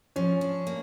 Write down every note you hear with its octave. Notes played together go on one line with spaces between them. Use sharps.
F3 C#4
D4
A#3